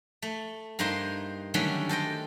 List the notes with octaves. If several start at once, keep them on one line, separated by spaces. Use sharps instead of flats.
A3
G2 A#3 D#4 C5 C6
D3 D#3 F#3 G3 A3 C#4
A4 C5 D#5 G5